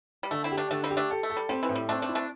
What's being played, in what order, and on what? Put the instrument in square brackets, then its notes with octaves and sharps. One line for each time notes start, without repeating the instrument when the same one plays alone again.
[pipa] G3
[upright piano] D3 [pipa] A3
[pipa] C4 E4
[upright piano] G4
[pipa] A3 D4
[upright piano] D3 [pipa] A3 D4
[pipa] G3 C4
[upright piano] G4
[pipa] A3 D4
[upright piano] A4
[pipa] A3
[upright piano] A4
[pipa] G3
[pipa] G3 [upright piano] C4
[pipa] E3
[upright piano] A2
[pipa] G3
[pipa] A3 D4 [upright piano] C4
[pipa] A3 D4
[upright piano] E4
[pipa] A3 D4